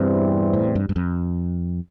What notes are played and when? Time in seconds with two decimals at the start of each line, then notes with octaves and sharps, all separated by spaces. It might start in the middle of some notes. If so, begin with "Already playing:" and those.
Already playing: E2 G2 C3 E3 G3 C4
0.53 A2
0.75 G2
0.89 G2
0.96 F2